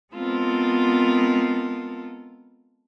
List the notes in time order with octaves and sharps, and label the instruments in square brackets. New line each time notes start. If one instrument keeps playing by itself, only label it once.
[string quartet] G#3 B3 C4 F4 A4 A#4